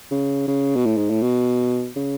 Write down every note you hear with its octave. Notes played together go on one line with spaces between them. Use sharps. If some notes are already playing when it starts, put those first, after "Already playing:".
C#3
C#3
B2
A2
G#2
A2
B2
C#3